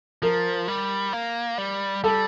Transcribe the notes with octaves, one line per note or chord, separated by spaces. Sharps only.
F3 A#4
G3
A#3
G3
G3 A4